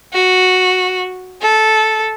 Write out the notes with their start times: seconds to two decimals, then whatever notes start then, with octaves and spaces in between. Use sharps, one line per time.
0.13 F#4
1.42 A4